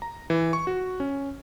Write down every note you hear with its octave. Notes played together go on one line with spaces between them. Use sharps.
A#5
E3
C#6
F#4
C#4